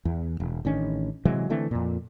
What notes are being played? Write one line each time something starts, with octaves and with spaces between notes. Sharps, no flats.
E2
E1
A1 D#3 C#4 D4
C3 E3 F#3 G#3
D3 E3 A3 C4
F2 A#2